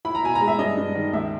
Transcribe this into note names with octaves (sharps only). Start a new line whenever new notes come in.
E4 B5
A#5
B2 G#5
A#5
G#3
E5
G2 D#5
G2
D#3
C#2 E5